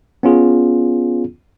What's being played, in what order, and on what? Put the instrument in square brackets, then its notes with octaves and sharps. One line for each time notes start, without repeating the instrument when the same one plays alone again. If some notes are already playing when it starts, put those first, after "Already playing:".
[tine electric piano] B3 C#4 F4 G#4